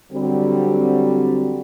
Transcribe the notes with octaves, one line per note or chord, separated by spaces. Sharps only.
D3 F#3 G3 C4